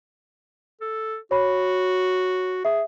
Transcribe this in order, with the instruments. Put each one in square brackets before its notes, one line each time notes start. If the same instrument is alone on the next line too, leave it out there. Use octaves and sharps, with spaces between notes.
[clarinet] A4
[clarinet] F#4 [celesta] C#5 B5
[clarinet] G#4 [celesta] E5